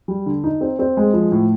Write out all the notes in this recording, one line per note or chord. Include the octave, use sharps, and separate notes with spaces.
G3
D3
D#4
C4
C4
G#3
F3
A2